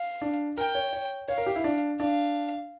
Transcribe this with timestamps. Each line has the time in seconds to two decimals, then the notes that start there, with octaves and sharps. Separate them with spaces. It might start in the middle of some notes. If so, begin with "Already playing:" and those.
Already playing: F5
0.22 D4
0.57 A#4 G5
0.75 C#5
0.93 C#5
1.28 C#5 F5
1.38 A#4
1.46 G4
1.56 E4
1.64 D4
2.00 D4 F5